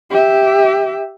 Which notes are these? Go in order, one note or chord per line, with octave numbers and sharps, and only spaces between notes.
G4 E5